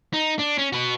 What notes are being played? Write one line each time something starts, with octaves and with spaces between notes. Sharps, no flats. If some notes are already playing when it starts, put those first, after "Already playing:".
D#4
D4
C#4
F#4 B4